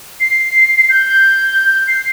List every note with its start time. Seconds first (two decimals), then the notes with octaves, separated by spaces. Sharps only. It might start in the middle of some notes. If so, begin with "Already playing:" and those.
0.20 C7
0.89 G6
1.87 C7